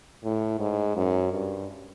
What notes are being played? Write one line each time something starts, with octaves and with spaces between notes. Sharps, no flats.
A2
G#2
F#2
G2